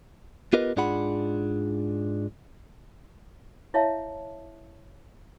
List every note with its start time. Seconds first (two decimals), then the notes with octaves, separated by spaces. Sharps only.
0.53 B3 F4 G4 A#4 B4 D#5
0.77 G#2 D4 F4 G#4 F#5 B5
3.74 E4 C#5 E5 F5 A5